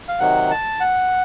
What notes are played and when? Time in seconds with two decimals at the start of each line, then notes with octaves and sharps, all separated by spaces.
0.08 F5
0.20 C3 D#3 F#3 F#5
0.51 A5
0.80 F#5